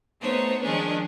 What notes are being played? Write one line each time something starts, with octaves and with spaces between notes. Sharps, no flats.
A3 B3 D#4 C5 C#5
D#3 F3 G#3 C#4 D4 G#4